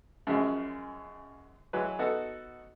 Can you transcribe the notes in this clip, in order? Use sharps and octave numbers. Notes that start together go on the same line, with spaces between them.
F#2 C#3 F3 G#3
E3 F#3 G#3 B4
B3 D#4 F#4 A4